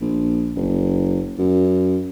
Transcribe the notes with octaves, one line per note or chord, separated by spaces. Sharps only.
A#1
F#1
F#2